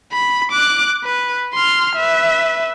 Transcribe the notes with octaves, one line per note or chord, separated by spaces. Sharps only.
B5
D6 F#6
B4
C6 F6
B4 E5